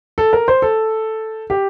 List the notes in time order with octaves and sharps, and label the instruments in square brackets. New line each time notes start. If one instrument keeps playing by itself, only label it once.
[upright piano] A4
A#4
C5
A4
G4